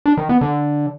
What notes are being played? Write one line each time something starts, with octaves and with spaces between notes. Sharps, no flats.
D4
D#3
B3
D3